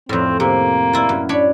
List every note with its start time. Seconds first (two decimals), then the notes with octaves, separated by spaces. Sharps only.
0.09 F2 A2 C4
0.40 C3 A#3
0.93 E4 F4
1.09 F#2
1.29 D4 C#5 B5